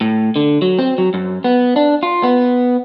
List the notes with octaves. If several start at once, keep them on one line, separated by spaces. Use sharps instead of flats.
A2
D3
F#3
C4
F#3
F#2
B3
D4
F4
B3